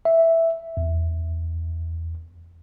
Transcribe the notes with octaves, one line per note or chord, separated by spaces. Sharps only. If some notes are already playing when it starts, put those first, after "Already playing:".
E5
E2